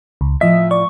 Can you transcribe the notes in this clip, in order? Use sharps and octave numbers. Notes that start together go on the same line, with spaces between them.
C#2
A2 F3 D#5 E5
D5 C#6